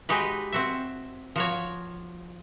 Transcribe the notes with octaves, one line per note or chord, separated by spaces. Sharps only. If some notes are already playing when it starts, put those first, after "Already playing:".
G#3 D#4 F#4 G4 B4
C4 F#4 E5
F3 F#4 C#5